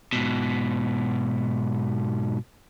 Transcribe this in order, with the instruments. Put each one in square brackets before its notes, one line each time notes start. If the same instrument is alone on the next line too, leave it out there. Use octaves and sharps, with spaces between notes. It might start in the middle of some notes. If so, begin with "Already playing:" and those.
[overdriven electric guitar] G#2 B2